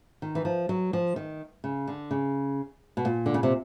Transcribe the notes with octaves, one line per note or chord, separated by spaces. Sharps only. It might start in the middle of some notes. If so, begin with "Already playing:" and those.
D#3
E3
F3
F#3
F3
D#3
C#3
D3
C#3
B2
A#2
D3
C#3
C3